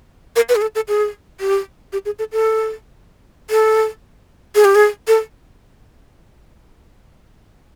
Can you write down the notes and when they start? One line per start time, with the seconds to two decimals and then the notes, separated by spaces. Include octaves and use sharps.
0.36 A#4
0.49 B4
0.55 G#4
0.62 A4
0.75 A4
0.88 G#4
1.40 G4
1.93 G4
2.05 G#4
2.19 A4
2.32 A4
3.50 A4
4.55 G#4
4.65 G4
4.75 G#4
5.08 A4